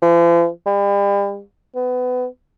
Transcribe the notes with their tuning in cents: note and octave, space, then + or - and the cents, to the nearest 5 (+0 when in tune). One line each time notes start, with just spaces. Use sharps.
F3 -45
G3 +40
B3 +25